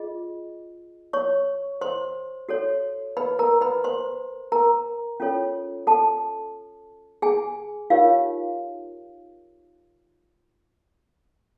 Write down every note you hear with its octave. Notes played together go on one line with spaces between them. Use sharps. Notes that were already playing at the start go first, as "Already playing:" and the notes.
Already playing: F4 G#4 D#5
C#5 C#6
C5 C6
F#4 A4 C#5
B4 B5
A#4 A#5
B4 B5
C5 C6
A#4 A#5
C#4 F4 A4 C#5
A4 A5
G#4 G#5
D#4 F4 G4 A#4 C#5 F5